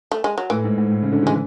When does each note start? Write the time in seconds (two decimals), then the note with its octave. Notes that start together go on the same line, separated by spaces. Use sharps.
0.12 A3
0.24 G#3
0.38 F#3
0.50 A2 E3
0.64 G#2
0.78 G#2
0.91 A2
1.02 C#3
1.12 D3
1.23 E3
1.27 G#3